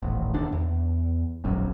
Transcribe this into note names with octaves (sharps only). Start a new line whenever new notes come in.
D#1 A1
E1 D#2 D4
E2
E1 A#1 F#2